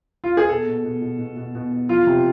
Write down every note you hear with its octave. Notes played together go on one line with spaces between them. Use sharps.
F4
G#4
B2 A4
B2
B2
B2
B2
B2
B2
B2
F3 F4
C3